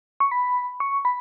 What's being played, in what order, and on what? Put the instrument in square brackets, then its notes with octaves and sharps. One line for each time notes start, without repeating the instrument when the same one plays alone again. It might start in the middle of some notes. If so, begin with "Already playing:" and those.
[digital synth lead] C#6
B5
C#6
B5